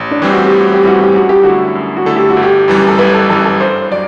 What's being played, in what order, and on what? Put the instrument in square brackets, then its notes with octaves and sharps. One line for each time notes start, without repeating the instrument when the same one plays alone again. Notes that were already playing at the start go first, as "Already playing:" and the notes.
Already playing: [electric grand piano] A1
[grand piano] D4
[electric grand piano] A2 E3 G3 C4
[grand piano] F#4
G4
[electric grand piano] A1
[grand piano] F#4
G4
[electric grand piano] A2 E3 G3 C4 [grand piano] F#4
[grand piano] G4
[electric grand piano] F#2 [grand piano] F#4
[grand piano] G4
[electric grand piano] D3 A3 E4 A4 [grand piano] F#4
[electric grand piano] F#2
[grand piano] F#4
[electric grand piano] D3 A3 E4 A4
[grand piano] G4
F#4
[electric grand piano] G1
[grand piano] G4
[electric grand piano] F#2 E3 G3
[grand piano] A4
[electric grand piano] G1 [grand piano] B4
[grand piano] A4
[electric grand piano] F#2 E3 G3 [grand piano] A4
[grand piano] A4
[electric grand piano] G2 [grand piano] C5
[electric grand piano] F#3 [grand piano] D5